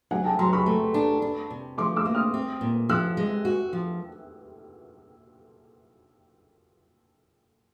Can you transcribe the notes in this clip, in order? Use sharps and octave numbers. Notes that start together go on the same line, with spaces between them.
F#3 F#5 G#5
G5 A5
F#3 A#5 C6
B5 C#6
A3
D4
D4
C3
F3 C6 D6
D6 E6
A#3
D#6 F6
C4
A#2
F3 E6 F#6
G#3
F#4
F3